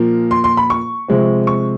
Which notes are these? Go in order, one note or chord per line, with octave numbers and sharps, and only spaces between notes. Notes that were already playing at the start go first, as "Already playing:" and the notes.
Already playing: A#2 F3 A#3
C6
C6
B5
C#6
C3 F3 G#3 C4
C#6